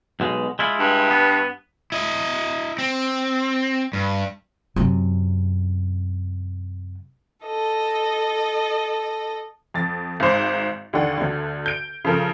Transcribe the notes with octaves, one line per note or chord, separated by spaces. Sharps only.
B1 B2 G#3
G#3 E4 F4
G2
B3
E4 D#5
C4
G2
F#2 C3
A4 D#5
F2 A6
G#1 G#2 C5 D6
D#2 D3 D#3 D5 F#5
D2 D3
G6 D7
C#3 F3 A4 A#4